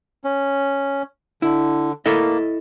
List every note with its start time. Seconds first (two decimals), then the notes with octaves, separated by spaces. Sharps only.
0.24 C#4
1.42 D3 E4
2.06 A#3 E4 A4 D#5